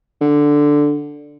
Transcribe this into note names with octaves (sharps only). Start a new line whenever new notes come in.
D3